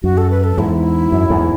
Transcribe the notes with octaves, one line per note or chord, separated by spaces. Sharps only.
F#2 F#4
A4
B4
A4
E2 G#2 E4
F#2
E2 G#2